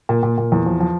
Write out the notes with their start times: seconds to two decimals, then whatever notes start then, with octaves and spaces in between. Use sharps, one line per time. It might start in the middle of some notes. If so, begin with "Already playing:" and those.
0.09 A#2
0.23 A#2
0.38 A#2
0.52 E2
0.66 F3
0.80 F3